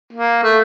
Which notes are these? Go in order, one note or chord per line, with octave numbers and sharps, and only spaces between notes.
A#3
A3